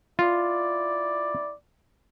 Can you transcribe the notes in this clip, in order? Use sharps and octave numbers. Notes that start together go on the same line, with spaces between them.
E4 F4 D5